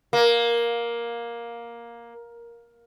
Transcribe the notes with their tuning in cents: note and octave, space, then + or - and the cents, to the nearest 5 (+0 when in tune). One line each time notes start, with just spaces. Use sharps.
A#3 +10